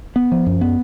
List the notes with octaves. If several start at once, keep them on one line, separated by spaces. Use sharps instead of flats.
B3
F3
F#2
B3